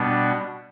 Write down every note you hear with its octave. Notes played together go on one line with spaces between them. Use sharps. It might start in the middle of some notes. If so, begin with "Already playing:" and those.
Already playing: B2 G3 B3 D4